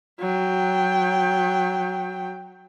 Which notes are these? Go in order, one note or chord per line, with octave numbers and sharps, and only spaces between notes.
F#3 G5